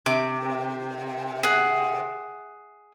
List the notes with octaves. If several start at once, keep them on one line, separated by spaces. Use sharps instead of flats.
C3 D6
G#4 F#5